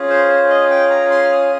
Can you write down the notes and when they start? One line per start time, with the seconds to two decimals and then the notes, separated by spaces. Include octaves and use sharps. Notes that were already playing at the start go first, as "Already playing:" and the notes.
Already playing: C#4 F4 G#4
0.10 C5
0.29 C5
0.50 D#5
0.71 G5
0.90 A#5
1.11 C6
1.25 F6
1.32 D#6